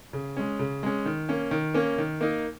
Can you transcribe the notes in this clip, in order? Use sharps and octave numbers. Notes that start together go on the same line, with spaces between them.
C#3
G#3 C#4
C#3
G#3 C#4
D#3
A#3 C#4
D#3
A#3 C#4
D#3
A#3 D#4